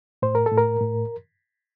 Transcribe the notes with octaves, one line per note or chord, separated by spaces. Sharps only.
A2 C5
A#4
A4
A2
A#4
A2